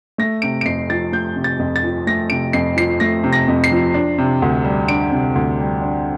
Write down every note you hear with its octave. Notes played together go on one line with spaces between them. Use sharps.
A3 A#6
C3 D7
D7
F2 C7
F3 A6
A3 G6
C3
A6
F2
A6
F3
A3 A#6
C3 D7
F2 C7
F3 C7
A3 A#6
C3
A#6
F2
C7
F3
D4
C3
D2
G3
D4 D7
C3
D2
G3
D4